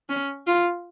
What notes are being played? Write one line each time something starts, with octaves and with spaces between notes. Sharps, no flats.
C#4
F4